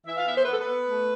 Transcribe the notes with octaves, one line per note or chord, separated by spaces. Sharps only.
E3 E5
F5
B3 E5
C5
B3 B4
A4
B3 B4
A3